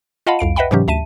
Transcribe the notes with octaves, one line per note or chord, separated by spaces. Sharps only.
F4 D#5 F5 F#5 A5 B5
C2 F2 F5 D7
B4 D#5 E5 F#5 G5 B5
G#2 C3 E3 F#3 C#4 G4
D2 E5 A5 D#7